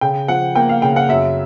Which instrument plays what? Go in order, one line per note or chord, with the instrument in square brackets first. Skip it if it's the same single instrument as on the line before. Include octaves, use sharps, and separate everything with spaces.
[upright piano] C#3 G5
F3 F#5
A#3 G5
F5
C#3 G5
F#5
F#2 E5